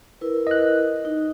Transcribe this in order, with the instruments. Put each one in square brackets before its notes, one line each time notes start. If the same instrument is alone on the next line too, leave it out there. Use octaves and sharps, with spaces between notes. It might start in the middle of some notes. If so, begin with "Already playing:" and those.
[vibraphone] E4 A#4 B4
[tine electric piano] D#5 F#6
[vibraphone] D#4